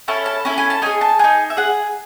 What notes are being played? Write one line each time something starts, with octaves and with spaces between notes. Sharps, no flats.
C#4 E4 A4 A5
A5
C#4 E4 A4 G#5
G#5
A5
D#4 G#4 G#5
A5
D#4 G#4 G#5
E5
G#4 F#5